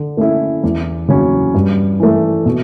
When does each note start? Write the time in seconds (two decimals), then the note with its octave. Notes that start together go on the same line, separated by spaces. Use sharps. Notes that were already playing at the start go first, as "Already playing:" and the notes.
Already playing: D3
0.17 A3 C#4 E4
0.64 E2
1.08 C#3 F#3 C#4
1.54 G2
2.00 E3 A3
2.46 B2